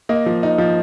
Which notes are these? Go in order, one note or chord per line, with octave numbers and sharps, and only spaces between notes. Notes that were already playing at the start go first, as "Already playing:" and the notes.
A#3 D#5
F3
D#4
F3